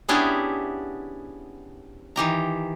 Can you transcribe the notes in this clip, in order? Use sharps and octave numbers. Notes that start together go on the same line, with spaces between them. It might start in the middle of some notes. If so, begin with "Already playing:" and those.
B3 C#4 D4 E4 G4 G#4
D#3 E3 G4 A#5